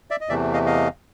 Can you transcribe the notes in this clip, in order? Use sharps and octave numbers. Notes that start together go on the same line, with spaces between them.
D5 E5
D#5
E2 C3 E3 A3 D5 E5
D#5 F5
D#5 F5